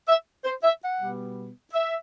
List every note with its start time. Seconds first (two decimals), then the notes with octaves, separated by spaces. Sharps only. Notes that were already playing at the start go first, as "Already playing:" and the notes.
0.08 E5
0.45 C5
0.63 E5
0.81 F#5
1.00 B2 G3 B3
1.73 E5